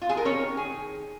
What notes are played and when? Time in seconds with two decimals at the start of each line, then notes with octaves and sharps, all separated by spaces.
0.02 F4
0.09 G#4
0.17 A#4
0.25 D#3 C#4 C#5
0.57 G#4